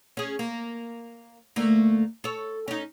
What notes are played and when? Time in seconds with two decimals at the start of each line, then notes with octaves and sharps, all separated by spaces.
0.17 C#4 G#4
0.39 A#3
1.56 D2 A3 A#3
2.24 A4 C#5
2.68 C#4 D#4